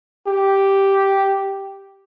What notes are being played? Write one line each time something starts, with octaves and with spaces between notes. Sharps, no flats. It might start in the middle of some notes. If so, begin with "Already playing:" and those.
G4